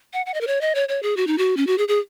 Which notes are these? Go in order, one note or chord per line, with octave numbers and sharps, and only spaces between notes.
F#5
F#5
D#5
A#4
C#5
D#5
C#5
C#5
G#4
F#4
D#4
F#4
C#4
F#4
G#4
G#4